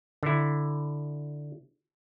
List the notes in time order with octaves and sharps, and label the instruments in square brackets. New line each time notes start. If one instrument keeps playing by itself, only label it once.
[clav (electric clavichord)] D3 E4